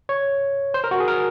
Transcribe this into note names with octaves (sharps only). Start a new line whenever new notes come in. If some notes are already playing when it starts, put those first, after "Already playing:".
C#5
C5
A#4
F#4
G#4
A#4